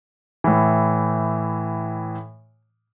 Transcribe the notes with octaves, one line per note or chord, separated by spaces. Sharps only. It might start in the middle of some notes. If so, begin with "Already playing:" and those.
A2 E3